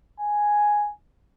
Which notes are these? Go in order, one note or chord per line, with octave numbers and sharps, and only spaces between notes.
G#5